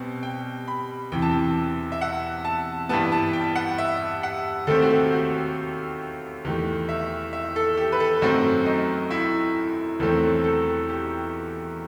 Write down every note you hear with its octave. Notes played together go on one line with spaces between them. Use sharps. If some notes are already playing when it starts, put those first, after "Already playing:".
Already playing: B2 G3 C4
G5
B5
E2 C3 E3 G5
A5
G5
E5
F#5
A5
G2 E3 G3 B3 A5
A5
G5
F#5
E5
F#5
D#2 D#3 A3 C4 A4
G4
F#4
G4
F#4
E2 D#3 A3 G4
E5
E5
A4
G4
B4
A4
F#2 D#3 A3 C4 F#4
D#4
E4
E2 D#3 F#3 A3 C4 A4
A4
G4